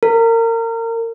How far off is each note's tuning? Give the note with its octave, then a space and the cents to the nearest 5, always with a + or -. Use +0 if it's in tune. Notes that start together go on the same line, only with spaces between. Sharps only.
A#4 -30